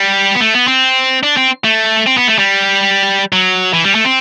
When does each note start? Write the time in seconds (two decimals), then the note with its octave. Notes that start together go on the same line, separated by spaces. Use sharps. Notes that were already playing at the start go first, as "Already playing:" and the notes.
Already playing: G3
0.35 B3
0.40 A3
0.54 B3
0.68 C4
1.23 D4
1.37 C4
1.64 A3
2.06 C4
2.18 B3
2.28 A3
2.39 G3
3.33 F#3
3.74 E3
3.84 G3
3.95 A3
4.05 C4